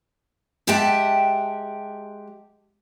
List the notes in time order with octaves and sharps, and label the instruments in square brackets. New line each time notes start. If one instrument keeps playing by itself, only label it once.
[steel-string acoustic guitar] G#3 G4 E5 F#5 G5 A5